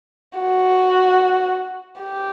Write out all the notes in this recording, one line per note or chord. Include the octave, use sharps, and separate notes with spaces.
F#4
G4